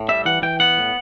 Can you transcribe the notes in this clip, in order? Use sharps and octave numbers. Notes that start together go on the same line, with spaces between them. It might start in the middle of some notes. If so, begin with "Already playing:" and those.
Already playing: A2
G3 E5
E3 F#5
E3 G5
B3 F#5
A2